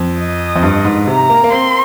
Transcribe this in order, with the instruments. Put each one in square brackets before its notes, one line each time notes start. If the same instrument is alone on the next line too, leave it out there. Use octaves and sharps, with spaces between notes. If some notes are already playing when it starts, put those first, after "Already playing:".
Already playing: [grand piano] F2
[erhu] D#5
[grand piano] F2
G2
G#2
[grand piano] C3 [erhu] A#5
[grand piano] A#3
A#3
[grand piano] C4 [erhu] C6